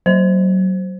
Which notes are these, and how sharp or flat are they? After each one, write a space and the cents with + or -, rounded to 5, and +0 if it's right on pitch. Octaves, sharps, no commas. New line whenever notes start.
F#3 +25 C5 +0